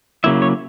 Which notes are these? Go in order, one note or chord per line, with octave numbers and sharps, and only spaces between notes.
C#3 F#3 A#3 E4 E5
C#5